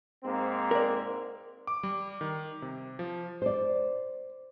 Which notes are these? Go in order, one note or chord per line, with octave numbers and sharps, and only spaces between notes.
G#2 A#3 C4
A#4 D5
D6
G3
D#3
C3
F3
C5 D5